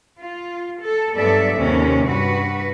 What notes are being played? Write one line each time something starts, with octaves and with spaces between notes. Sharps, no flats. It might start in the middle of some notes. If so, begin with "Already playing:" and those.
F4
A4
G2 F#3 B3 A4 D5 E5
D#2 C3 C4 C#4
G2 F#4 B4